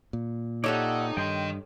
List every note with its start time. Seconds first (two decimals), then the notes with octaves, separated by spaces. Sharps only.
0.13 A#2
0.64 D#4 G4 A4 C#5 D5 E5 F#5
1.17 G2 D#3 D#5 G5 C6